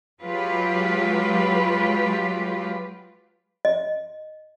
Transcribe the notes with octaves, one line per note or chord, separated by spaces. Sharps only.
F#3 G#3 F4 G4 B4
D#5